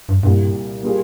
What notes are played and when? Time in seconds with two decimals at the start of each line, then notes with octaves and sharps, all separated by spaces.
0.09 G2
0.23 C2 G2 A#2 G3
0.52 A#2
0.83 G3 A#3 F4 G#4